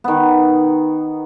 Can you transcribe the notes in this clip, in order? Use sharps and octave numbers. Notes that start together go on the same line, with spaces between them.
D#3 B3